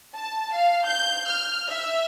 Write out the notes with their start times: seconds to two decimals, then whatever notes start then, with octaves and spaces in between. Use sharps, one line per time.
0.15 A5
0.54 F5
0.87 G6
1.28 F6
1.69 E5